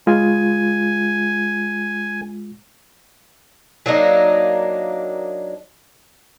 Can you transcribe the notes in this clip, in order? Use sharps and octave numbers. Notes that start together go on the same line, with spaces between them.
G#3 F4 G#5
F#3 A#3 D4 D#4